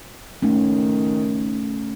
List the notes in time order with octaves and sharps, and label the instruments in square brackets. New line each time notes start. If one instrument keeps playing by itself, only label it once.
[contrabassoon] D#3 [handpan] A3 C#4